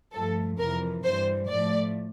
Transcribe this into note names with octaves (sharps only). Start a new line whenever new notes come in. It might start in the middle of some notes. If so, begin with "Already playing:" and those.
G2 F3 A3 A4
F2 C3 E3 A#4
G2 E3 G3 C5
A2 F3 A3 D5